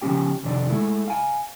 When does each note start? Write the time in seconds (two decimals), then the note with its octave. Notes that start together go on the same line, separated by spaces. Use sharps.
0.01 C#3 F3 G3 C#4 G4 G5
0.43 F2 C3 D#3 D4 D5
0.69 G#3 A3 E4
1.08 F5 G#5